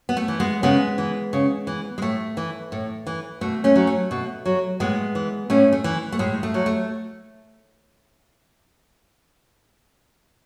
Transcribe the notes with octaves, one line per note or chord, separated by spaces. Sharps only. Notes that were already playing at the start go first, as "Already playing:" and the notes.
B3
A3
E3
G#3 B3
C#3 G#3 B3
E3
C#3
E3
G#3
A2 A3
E3
A2
E3
B2 A3
A3 C#4
F#3
A3
B2
F#3
A2 G#3 B3
E3
A2 A3 C#4
A3
E3
A3
A2 G#3
A3
F#3
A3